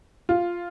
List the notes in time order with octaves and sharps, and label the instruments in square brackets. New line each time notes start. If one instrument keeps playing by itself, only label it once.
[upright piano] F4